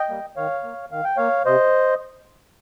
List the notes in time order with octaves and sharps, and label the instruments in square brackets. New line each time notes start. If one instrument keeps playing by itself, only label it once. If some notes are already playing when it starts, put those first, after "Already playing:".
Already playing: [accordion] D#5 G5
G3 A#3
D#3 C#5 F5
A#3
D#3 F5
G5
A#3 C#5 F5
C3 C5 D#5